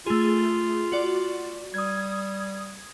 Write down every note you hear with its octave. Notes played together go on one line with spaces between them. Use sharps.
A3 F4 G#4
F#4 D5
G3 D#6 G#6